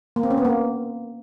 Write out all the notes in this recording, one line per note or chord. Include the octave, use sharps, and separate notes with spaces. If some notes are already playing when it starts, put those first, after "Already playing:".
A#3
C4
C#4
B3
A#3